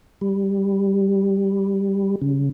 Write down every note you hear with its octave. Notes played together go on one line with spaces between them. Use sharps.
G3
C#3